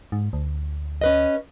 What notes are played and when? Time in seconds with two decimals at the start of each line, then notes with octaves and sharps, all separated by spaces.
0.12 G#2
0.33 D2
1.01 C#4 B4 D#5